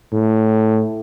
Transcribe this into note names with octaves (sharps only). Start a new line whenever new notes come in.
A2